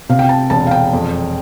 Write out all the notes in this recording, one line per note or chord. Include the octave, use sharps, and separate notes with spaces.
C3 F5
G5
A5
E1 A5
F5
G5
F2